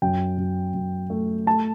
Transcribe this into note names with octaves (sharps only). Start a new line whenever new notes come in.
F#2 G5
F#2
F#2
A3
A3 A5